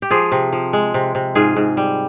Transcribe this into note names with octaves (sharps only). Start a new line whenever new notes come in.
G4
F3 F4 G#4
C3
F3
G#3
C3
C3
G#2 F4 G#4
G#2
G3